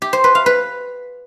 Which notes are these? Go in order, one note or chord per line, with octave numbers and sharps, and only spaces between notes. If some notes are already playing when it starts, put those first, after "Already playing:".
G4
C5
B4
F5
B4